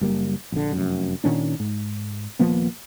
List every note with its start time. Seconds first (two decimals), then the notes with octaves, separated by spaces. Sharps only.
0.01 F#1 G3 A#3
0.52 A#1 D3
0.72 F1 F#2
1.24 A#2 D#3 C#4 D4
1.60 G#2
2.39 D#1 F3 A#3 B3